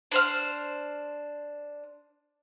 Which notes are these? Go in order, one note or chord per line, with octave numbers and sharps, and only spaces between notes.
D4 C5 F6